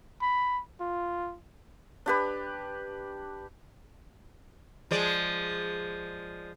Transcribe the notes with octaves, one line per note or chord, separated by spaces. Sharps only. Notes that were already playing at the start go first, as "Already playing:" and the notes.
B5
F4
D4 G4 B4
F3 G#3 D5